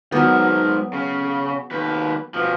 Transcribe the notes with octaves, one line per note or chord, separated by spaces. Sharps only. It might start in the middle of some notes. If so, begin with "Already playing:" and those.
G#2 F#3 B3 A#4
C#3
D#2 B4
B2 F3